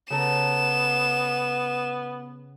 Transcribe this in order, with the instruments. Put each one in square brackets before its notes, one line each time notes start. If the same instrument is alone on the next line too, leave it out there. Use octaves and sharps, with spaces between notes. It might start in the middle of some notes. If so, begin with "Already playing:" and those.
[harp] C#3 A4 A#5 [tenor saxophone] B3 [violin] E7